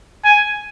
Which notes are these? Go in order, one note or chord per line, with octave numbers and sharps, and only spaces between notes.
G#5